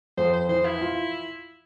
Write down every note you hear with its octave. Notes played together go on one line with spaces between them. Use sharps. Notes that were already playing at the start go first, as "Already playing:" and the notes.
F2 C5
C5
E3 C5
E4
F4